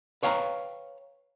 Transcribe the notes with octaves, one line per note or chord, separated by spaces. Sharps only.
B4 C#5 F5 G5 A5 A#5